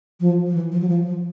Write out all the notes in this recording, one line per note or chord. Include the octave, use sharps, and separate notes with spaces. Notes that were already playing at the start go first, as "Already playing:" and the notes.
F3
F3
E3
F3
F#3
F3
F3